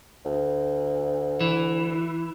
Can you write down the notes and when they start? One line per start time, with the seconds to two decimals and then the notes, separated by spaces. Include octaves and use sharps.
0.25 D2
1.40 E3